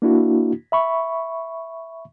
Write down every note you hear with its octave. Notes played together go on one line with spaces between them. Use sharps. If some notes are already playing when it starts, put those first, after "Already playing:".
A#3 D4 E4 F#4
E5 B5 C#6